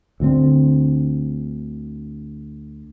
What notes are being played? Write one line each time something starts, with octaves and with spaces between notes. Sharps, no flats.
D2 D3 C4